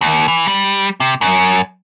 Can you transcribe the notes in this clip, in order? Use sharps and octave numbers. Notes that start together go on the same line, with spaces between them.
D#2
E3
G3
C3
F#2